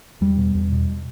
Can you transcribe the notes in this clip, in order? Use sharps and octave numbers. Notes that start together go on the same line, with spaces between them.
E2 G3
B2
E2
B2